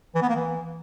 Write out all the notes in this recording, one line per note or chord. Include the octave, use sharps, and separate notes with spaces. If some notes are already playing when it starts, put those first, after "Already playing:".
E3
B3
A#3
E3